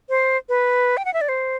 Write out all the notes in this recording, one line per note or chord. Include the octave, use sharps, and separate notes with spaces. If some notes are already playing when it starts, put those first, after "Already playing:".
C5
B4
G5
F#5
E5
D5
C5